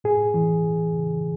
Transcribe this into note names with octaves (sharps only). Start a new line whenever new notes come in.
A2 G#4
E3
E3
C#3